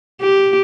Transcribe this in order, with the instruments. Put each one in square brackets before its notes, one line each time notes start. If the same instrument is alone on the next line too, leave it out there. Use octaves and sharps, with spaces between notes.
[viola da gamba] G4